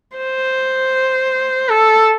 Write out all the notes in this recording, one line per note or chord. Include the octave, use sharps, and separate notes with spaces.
C5
A4